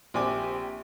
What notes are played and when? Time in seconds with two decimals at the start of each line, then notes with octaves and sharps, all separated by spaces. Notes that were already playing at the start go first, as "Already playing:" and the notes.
0.14 A#1 C4 G4 G#5 D6